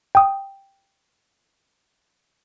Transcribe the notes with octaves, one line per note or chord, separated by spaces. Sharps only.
G5 D#6